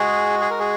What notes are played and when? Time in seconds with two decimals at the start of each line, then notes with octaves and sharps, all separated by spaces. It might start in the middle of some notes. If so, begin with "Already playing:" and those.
Already playing: G#3 F#4 G#4
0.41 G#4
0.50 A#4
0.60 G#4